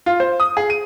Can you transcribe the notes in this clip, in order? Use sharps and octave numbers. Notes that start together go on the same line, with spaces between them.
F4
C5
D#6
G#4
D#7